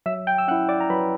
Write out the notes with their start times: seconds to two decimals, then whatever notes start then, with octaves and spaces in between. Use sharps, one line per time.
0.06 F#3 E5 E6
0.27 G5 G6
0.38 E6
0.48 C#4 F#5 F#6
0.51 E4
0.69 D5 D6
0.81 A#5
0.90 F#3 B4 B5